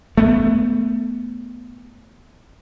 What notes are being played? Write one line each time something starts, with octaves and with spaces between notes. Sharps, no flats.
A3 B3